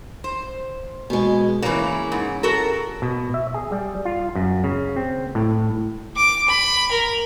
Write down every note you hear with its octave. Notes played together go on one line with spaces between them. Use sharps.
C5
B2 G#3
C#3 E3 A#3 E4
G#2
F#4 A4 A#4
B2
E5
G#4
G3
F4
F#2
C#3
C4
A2
D6
B5
A#4